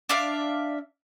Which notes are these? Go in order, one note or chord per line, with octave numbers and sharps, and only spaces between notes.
D4 D5 E5 F5